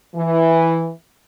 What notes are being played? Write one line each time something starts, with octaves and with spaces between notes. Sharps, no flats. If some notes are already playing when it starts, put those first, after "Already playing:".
E3